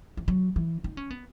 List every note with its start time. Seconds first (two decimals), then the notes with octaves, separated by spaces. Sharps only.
0.17 E3
0.28 F#3
0.56 E3
0.84 D#4
0.97 C#4
1.10 B3